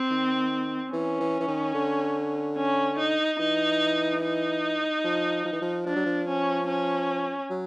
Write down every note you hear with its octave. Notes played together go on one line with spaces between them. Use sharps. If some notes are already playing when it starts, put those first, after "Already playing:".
Already playing: C4
D#3
E3 C#4
E3
E3
D#3
D3
C#4
D#4
E3 D#4
D#4
F3
F3
E3
F3
F3 D4
F#3
F3
C#4
C#4
F#3